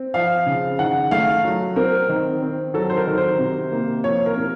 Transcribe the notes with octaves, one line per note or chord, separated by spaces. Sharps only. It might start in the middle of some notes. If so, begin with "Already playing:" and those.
Already playing: C4
F3 F5
C#3
D#3 F#5
A3 F5
F#3
C4 A#4
D#3
C4
F#3 A4
C5
A#4
D#3
C5
C3
A#3
F3 C#5
A#4
C3